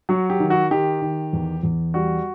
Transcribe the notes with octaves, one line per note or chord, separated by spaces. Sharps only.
F#3 F#4
G4
D#3
F#4
D#3 G4
D#3
E2
E2
G3 F#4